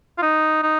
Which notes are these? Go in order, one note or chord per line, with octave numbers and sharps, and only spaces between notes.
F4
D#4
D#4